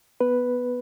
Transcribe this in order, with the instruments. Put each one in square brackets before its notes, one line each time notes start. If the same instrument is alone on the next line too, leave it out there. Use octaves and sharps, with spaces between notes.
[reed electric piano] B3 B4